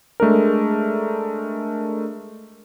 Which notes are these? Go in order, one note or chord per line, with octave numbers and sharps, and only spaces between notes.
G#3 A3 D4 A#4